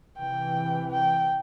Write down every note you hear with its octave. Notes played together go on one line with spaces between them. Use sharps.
C3 E3 G5
G5